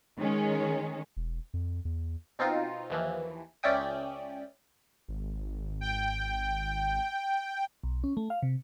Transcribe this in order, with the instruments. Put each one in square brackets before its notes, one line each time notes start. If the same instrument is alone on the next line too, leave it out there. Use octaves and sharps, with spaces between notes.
[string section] D#3 G#3 C#4
[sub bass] E1
F2
E2
[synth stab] B2 C4 D#4 F4
D#2 E3 F3
C#2 C#4 D5 E5 G5 D#6
[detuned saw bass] G#1
[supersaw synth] G5
[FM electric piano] B1
C#4
A3
F5
C3